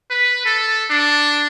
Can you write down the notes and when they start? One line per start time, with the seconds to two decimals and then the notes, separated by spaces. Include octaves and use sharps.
0.10 B4
0.45 A4
0.90 D4